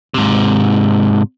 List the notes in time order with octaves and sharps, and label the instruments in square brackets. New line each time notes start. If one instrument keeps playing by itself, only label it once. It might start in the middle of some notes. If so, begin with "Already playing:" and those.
[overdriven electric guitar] G#2 C3